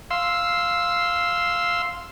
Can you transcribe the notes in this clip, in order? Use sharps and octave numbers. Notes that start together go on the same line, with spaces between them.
F5 C6 E6